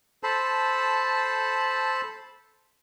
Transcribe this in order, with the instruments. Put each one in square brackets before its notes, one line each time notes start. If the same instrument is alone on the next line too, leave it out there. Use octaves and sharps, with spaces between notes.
[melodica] A4 C5 A5 B5